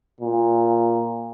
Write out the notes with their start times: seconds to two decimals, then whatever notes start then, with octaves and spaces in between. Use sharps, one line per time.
0.21 A#2